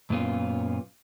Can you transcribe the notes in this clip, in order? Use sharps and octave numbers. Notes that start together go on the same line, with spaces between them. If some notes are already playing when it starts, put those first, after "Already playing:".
F#2 A#2 B3 C#4 F4